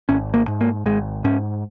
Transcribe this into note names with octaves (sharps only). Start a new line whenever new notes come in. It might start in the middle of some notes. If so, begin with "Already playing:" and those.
G#1 C#4
A#3
G#2
A#3
G#1 G#3
G#2 C#4